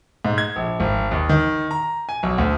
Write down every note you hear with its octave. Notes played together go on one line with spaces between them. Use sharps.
G#2
G#6
A#1
G#1
D#2
D#3
A#5
G#5
B1
D2